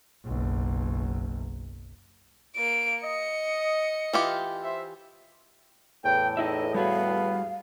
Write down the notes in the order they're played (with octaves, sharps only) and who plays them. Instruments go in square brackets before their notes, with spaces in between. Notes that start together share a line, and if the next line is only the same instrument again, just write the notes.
[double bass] F#1 B1
[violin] A#3 D7
[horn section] D#5 [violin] C#7
[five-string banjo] E3 F4 G4
[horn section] C5 E5
[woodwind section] E2 A2 [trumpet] G5
[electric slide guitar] D#4 E4 E5 [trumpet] D#5
[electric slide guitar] G3 F#4 G#4 [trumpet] B3 [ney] F5